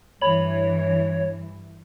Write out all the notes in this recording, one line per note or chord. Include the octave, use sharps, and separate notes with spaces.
G2 E3 C#5 B5 F#7